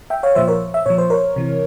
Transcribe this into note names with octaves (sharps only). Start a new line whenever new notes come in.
E5 G5
C#5 F5
A#2 F3 C5 E5
A#4 C#5
E5
A#2 F3 C#5
C5
A#4 C#5
C3 E3